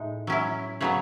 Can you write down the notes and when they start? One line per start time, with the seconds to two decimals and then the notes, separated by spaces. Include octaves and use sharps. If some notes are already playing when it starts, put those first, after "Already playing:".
Already playing: A2 G#3 D#4
0.27 F#3 C#4 E4
0.81 C#3 F#3 B3 C#5